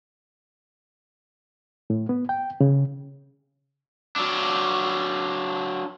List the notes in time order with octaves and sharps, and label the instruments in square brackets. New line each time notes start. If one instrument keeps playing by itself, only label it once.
[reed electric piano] A2
B3
G5
C#3
[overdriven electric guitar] F#3 D4